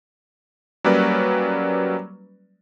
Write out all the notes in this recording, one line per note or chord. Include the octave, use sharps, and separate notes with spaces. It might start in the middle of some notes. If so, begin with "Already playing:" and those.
F#3 G3 A#3 C#4 B4 D5